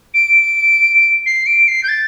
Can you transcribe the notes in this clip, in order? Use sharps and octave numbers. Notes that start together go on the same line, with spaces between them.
D7
C7
D7
C7
G6
A6